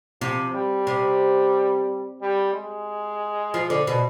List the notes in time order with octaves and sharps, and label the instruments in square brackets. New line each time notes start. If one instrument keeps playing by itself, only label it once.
[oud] C3 [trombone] F3
[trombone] G3
[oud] C3
[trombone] G3
G#3
[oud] F3
D3
B2